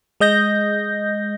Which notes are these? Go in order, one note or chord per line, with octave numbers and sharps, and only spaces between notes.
G#3 D#5 G6 A#6